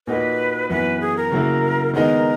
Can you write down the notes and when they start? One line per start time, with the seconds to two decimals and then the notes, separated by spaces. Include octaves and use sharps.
0.07 A#2 A#3 D#4 F#4 B4
0.69 F#2 E3 B3 B4
1.01 G#4
1.17 A#4
1.31 C#3 F#3 A#3 E4
1.94 D#3 G#3 B3 D#4 A#4